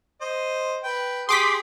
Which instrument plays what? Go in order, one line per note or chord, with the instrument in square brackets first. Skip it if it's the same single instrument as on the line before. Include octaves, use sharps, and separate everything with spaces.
[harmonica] C5 D#5
B4 G5
[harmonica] G4 G#4 D#6 [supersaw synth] C6 D6 B6